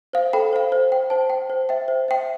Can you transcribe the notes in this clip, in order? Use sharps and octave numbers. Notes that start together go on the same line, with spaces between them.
C5 F5
A4 G5 B5
C5 F5
C5
G5
C5 A5
G5
C5
E5 G5
C5
E5 G5